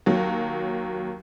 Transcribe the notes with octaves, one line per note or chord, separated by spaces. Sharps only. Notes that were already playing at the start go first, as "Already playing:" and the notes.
D#2 F#3